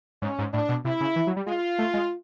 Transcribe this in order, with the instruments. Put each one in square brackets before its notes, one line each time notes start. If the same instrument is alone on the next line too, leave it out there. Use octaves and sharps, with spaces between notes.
[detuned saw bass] G#2 [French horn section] C#4
[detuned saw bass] G#2
[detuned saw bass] A2 [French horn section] D4
[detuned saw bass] B2
[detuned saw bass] C3 [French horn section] E4
[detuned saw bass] C#3
E3
F#3
G3
[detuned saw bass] G#3 [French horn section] F4
[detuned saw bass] A3
G#3